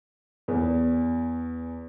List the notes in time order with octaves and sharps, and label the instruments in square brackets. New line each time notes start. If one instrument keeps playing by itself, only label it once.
[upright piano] E2